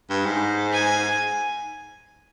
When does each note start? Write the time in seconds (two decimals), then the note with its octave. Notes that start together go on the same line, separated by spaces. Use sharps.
0.10 G2
0.26 G#2
0.73 G#5